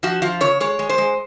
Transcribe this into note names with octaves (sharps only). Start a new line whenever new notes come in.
F3 F#4
F3 F4
C#3 C#5
G#3 C#5
G#3
C5
G#3